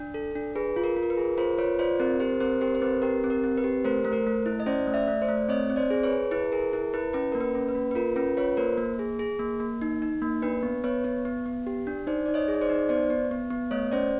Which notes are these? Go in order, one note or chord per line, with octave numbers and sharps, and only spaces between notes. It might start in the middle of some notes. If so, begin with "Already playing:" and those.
Already playing: D4
A4
D4
G#4 B4
F4
A#4
F4
A#4
B4
G#4
F4 A#4 C5
F4 B4 C#5
F4 C5 D5
C4 A#4 C5
G4 A#4 C5
C4 A#4 C5
G4 A#4 C5
C5
C4 B4
G4 A#4
C4
A#4
C4
B4
G4
A3 A#4 C5
A3
A#4 C5
A3
E4
D#5
C#4 C5 D5
A3
D5 E5
A3
C5 D5
A3
C4 C#5 D#5
C4
C5 D5
G#4
B4 C#5
G#4
E4 B4
G#4 A#4
E4 A#4
E4 B4
C#4 B4
A#3 A#4
B4
C#4
B4
A#3
B4
F4 A#4
C#4 B4
F4 B4 C#5
A#3 A#4 C5
A#3
G#4
G#4
A#3
A#3
D#4
D#4
A#3
D4 B4
B3
B3 B4 C#5
B3
B3
B3
G4
D4
D#4 C5 D5
D#4 D5
C#5 D#5
G#4
D#5
C5 D5
D#4
B3 C5 D5
B3
B3
B3
A3 C#5 D#5
C#4 C5 D5